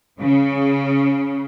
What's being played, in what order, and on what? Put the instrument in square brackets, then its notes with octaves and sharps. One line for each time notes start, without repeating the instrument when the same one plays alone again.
[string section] C#3